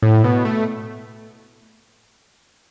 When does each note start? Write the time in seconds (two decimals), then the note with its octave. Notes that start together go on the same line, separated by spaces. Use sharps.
0.03 A2
0.24 B2
0.45 A3